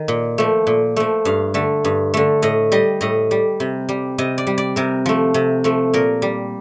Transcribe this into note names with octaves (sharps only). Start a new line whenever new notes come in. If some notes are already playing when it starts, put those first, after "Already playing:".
Already playing: D#3
A#2
F3 A3
A#2
F3 A3
G2 F5
D3 A3
G2
D3 A3
A2 D#5
G3 D#5
A2 D#5
G3
C3
G3
C3 D#5
D5
G3
D5
C3 A#4
F3 A3
C3
F3 A3
A#2 A#4
G3